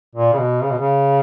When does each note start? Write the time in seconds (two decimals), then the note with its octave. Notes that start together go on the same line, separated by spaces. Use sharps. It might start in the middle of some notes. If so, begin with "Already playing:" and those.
0.15 A#2
0.33 C#3
0.39 B2
0.63 C#3
0.71 B2
0.78 C#3